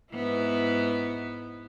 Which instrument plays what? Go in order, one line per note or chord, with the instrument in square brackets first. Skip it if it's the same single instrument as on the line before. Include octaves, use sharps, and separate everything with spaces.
[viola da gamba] G#2 B3 E4